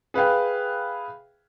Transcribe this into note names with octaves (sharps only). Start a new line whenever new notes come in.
G#4 B4 E5 F5 G5